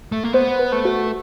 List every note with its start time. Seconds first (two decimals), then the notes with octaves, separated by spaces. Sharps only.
0.12 A3
0.24 A#3
0.33 B3 C5
0.59 B4
0.72 A3
0.85 F#4